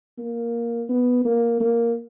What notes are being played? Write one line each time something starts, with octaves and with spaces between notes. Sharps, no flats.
A#3
B3
A#3
A#3